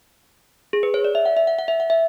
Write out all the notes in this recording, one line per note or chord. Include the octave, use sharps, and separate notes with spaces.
G#4
B4
C#5
D5
E5
F#5
E5
F#5
F#5
E5
F#5
E5